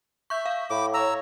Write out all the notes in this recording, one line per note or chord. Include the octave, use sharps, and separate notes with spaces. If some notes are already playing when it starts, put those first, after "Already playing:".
E5 C#6 G6
F5
A2 B5 D6
C#5 A#5 E6